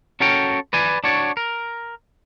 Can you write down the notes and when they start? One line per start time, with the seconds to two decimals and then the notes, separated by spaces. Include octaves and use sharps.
0.20 C#4 F#4 A4 A#4 C#5 G5
0.73 B4 D5 G#5
1.04 D4 F#4 C#5 D5
1.37 A#4